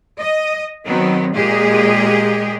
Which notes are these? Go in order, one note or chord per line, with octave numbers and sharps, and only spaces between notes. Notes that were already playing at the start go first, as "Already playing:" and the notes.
D#5
D#3 F#3 B3 C4
A#2 G#3 G4 G#4 D#5